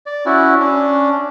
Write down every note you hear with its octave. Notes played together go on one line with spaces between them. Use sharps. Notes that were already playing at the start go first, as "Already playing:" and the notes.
D5
C#4 E4 F#4
C#4 D4